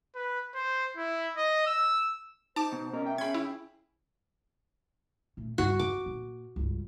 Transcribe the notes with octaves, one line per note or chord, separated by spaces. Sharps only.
B4
C5
E4
D#5
E6
D#4 C5 A5 D6
B2
B2 C#4 A#4 D#5
E5 G5
C#4 G#4 B5 G#6
E4
A#2 A3
G2 C#3 F#4
F2 D6
A#2
C#2 G2